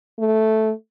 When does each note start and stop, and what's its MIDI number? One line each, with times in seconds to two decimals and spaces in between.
0.19 0.71 57